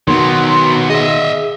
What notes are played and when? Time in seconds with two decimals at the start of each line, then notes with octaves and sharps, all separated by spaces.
0.08 B2 D#3 F#3 B3 C6
0.90 G#4 D#5 E5